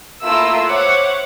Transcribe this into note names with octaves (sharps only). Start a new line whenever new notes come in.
A3 A#3 E4 F4 E6
C5 C#5 E5 F#5 D6